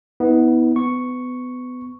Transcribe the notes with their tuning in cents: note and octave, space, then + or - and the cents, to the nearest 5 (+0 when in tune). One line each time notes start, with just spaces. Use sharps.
B3 +0 E4 -40
B3 +25 C#6 +0